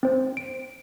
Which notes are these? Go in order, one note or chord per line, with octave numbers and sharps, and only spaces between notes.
C4 C5
D7